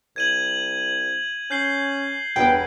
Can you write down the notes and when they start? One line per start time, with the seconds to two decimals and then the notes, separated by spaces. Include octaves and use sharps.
0.16 C2 G#6 D#7 F#7
1.51 C#4 G6 C7 G7
2.36 E1 G2 B3 G5